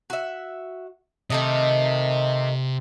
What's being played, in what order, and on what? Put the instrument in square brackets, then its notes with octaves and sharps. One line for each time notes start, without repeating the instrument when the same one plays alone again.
[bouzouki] F#4 E5
[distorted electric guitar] C3 [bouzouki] D#3 A3 D#4